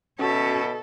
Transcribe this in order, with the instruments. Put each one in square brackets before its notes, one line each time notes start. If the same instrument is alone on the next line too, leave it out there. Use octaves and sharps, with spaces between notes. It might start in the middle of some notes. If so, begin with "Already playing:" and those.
[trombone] B2 [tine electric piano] C#4 F#4 [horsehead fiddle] A4 [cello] C#5 E5